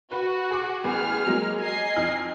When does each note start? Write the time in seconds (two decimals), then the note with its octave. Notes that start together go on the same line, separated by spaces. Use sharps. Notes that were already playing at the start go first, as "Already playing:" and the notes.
0.11 F#4 B4
0.51 G#4 D6
0.84 A1 B3 G#4 F6
1.27 F#3 G#3 A#3
1.62 D#5 G#5 C7
1.96 F2 D#4 F6